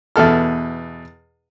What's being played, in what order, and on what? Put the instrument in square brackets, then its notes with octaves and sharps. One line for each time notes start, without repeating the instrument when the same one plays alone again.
[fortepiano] E2 B2 A4 F6